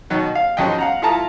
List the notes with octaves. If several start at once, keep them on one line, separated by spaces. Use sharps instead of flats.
B2 D#3 F#3
F5
G#2 C#3 F3 F#3 D#5 G5
F5 F#5 A#5
E4 F4 A4 A5 A#5 D#6